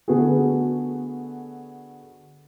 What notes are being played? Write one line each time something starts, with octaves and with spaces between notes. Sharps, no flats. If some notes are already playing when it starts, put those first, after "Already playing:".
D3 A3 B3 F#4 G#4